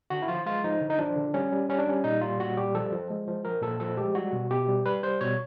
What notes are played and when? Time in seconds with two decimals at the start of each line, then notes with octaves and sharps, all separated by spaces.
0.10 D3 F#4
0.22 E4
0.28 F3 F4
0.46 G#3 F4
0.64 F3 D#4
0.81 D3
0.90 D#4
0.99 F3 D4
1.16 D3
1.34 G3 C#4
1.52 G3
1.69 G3 C#4
1.79 D4
1.87 G3 C#4
2.04 A#2 D#4
2.21 G3 F4
2.40 A#2 F#4
2.57 G3 G4
2.75 F3 A4
2.92 F3
3.10 G#3
3.27 F3
3.45 F3 A#4
3.62 A#2 A4
3.80 F3 A4
3.97 G#3 G4
4.15 G3 F#4
4.33 B2
4.50 B2 G4
4.68 G3
4.86 G3 B4
5.03 G3 C5
5.21 B2 C#5